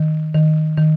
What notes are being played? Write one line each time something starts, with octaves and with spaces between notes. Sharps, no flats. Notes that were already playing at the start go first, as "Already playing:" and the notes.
Already playing: D#3
D#3
D#3